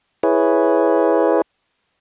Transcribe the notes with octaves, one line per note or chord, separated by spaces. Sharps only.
E4 G#4 B4 C#5